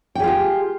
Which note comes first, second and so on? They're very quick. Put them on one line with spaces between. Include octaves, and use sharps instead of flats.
G5 G#4 F4 G4